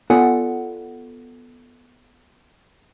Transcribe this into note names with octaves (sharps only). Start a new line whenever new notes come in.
B3 F4 A4 D5 F#5 G#5